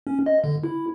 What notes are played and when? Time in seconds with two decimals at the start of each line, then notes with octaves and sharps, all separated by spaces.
0.07 C#4
0.26 D#5
0.44 D3
0.64 E4